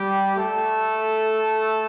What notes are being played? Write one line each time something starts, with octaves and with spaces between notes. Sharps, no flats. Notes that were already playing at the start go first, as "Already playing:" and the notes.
Already playing: G3 G4
A3 A4